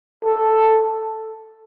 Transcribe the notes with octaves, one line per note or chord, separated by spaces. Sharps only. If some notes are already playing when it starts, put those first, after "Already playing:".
A4